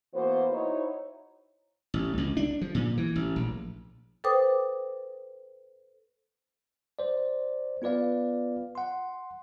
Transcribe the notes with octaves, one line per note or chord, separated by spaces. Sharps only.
E3 A#3 B3 F#4 B4 C5
D#4 E4 F#4 C5 C#5
A1
C#2
D4
F3
A#2
E3
A1
A#1
A4 B4 C5 G5 D6 D#6
C5 D5
B3 F4 B4 D5 F5
F#5 C6